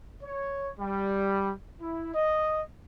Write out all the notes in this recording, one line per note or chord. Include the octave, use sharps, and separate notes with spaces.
C#5
G3
E4
D#5